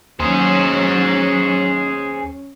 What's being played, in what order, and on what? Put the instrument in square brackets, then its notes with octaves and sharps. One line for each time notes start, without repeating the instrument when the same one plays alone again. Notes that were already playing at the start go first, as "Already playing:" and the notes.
[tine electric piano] D#2 [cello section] F#3 [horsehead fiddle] C#4 [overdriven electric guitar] G#4 C5